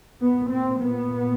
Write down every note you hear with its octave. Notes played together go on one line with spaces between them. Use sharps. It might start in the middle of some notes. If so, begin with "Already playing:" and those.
A#2 B3
C4
B3